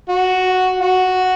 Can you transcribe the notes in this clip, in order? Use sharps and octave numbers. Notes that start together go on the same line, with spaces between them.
F#4
F#4